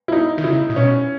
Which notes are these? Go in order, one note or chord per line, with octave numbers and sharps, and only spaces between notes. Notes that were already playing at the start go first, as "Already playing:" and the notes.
E4
D#4
D#3
C#3 E4
A#2
B2 C#4